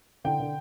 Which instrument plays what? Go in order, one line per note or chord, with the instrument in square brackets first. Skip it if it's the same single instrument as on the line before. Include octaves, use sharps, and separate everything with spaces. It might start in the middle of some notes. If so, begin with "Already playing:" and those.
[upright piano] D3 G5
D3